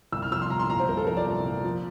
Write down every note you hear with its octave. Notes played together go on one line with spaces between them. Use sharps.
C2 E6
F6
F3 E6
C6
C2 A#5
C6
A#2 A#5
C5
C2 A#4
A4
F3 A#4
D5
C2
A#2
F3